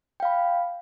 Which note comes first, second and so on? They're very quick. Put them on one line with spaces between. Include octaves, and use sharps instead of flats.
G5 F5 B5